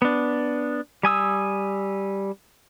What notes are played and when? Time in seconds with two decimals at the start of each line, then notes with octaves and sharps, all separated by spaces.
0.02 B3 D4
1.03 G3 G#5 D#6 E6